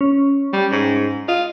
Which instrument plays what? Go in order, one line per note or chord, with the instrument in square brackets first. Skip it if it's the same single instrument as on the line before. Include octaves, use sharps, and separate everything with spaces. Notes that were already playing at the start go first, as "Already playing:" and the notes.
[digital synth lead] C#4
[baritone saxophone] G3
G#2
[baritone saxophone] F4 [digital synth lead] D#5